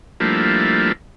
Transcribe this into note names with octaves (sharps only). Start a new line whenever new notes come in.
F3 G3 A3 A#3 D4 E4